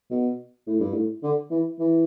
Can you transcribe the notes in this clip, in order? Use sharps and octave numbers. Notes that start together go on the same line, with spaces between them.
B2
A2
G2
A2
D3
E3
E3